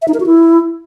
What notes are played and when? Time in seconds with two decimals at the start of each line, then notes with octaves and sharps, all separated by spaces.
0.02 E5
0.08 D#4
0.14 A#4
0.20 F#4
0.26 E4